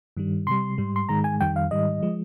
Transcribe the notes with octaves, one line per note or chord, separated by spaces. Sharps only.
G2 D#3 G3
C3 G3 C6
G#2 G3
C6
G#2 D#3 G#3 A#5
G#5
F2 D#3 G3 G5
F5
G#2 D#3 G3 D#5
F3 G#3